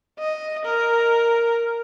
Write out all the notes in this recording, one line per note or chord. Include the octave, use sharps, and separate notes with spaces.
D#5
A#4